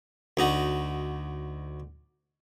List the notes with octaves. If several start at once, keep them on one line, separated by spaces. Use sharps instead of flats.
D2 D#4 F#4